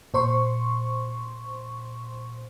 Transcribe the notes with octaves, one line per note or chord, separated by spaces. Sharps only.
A#2 C5 C6 C#6